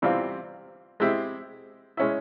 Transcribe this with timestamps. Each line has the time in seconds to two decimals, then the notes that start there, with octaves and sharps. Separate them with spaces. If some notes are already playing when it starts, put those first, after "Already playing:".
0.02 C3 E3 G3 C4 F4
1.00 G#3 C4 E4 G4
1.97 G#3 C#4 E4